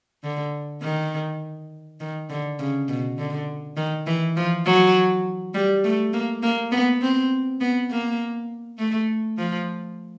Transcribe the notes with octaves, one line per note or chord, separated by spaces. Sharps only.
D3
D#3
D#3
D3
C#3
B2
D3
D#3
E3
F3
F#3
G3
A3
A#3
A#3
B3
C4
B3
A#3
A3
F3